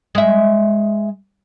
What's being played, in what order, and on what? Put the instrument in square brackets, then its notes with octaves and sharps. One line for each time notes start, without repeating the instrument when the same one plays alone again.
[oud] G#3 E5